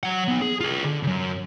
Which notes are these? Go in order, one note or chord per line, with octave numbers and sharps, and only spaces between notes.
F#3 F#5
B3 D#4
G#4
F4 G#4
D3
F#2 C#3